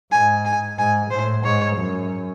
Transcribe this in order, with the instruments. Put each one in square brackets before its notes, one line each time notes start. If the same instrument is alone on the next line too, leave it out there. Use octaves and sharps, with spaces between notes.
[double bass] G#2 [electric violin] G#5
[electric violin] G#5
[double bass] G#2 [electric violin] G#5
[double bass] A2 [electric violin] C5
[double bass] G#2 [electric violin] C#5
[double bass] F#2